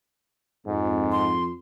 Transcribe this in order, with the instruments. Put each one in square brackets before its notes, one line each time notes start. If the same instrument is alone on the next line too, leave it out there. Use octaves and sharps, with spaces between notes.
[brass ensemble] F2 [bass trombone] G#2
[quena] C6